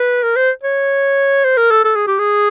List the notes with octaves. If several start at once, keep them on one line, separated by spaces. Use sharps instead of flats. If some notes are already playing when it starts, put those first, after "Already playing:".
Already playing: B4
A#4
C5
C#5
C5
A#4
A4
A4
G#4
G4
G#4